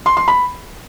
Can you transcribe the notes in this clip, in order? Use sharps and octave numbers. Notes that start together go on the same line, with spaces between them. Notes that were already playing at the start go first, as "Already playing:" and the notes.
C6
C6
B5